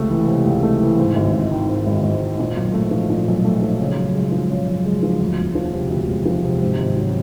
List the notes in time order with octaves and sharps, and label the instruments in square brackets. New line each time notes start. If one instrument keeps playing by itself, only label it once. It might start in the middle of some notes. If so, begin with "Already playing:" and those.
Already playing: [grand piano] C#2 C3 A3
E3
C3
C#2
A3
E3
G#2
G#1
G#1
D#3
G#2
G#1
G#1
D#3
A#2
B1
A3
F3
A#2
B1
A3
F3
C#3
F#2
G#3
F3
C#3
F#2
G#3
F3
D2
E1
F3
C3
D2
E1
F3
C3
G#2
G#1
F#3